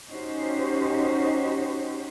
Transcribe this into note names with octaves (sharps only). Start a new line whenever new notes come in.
C#4 D#4 F#4 G4 C5